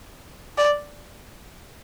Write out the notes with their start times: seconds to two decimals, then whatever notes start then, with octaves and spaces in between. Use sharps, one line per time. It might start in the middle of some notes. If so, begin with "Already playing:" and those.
0.58 D5